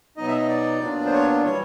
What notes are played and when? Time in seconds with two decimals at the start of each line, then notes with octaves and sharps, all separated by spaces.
0.17 B2 F#3 B3 D#4 D#5
0.28 E5
0.38 D#5
0.48 D5
0.80 A#2 F#3 B3 D4 F4
1.06 C5
1.12 C#5
1.43 E3 G3 C#5